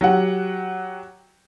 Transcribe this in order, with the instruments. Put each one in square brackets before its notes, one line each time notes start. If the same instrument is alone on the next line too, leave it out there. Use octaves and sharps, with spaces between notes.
[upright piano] F#3 G4 F#5